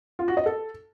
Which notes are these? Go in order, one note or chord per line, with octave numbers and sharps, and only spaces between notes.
F4
F#4
D#5
A4